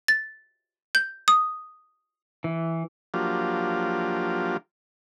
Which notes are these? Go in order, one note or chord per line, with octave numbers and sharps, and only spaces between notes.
A6
G6
D#6
E3
F3 F#3 A#3 D4 F4 G4